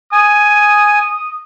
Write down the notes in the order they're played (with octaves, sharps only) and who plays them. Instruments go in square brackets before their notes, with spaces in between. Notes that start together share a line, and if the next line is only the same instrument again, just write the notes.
[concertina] G#5 [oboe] D#6